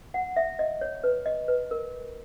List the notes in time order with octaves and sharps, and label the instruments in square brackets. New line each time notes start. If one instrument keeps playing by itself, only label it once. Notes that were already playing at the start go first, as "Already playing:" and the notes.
[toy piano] F#5
E5
D#5
C#5
B4
D#5
B4
A#4